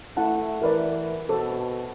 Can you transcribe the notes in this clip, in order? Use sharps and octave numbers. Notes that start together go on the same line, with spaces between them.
A3 E4 F#5 A5
E3 A#4 B4 D5
B2 A4 C5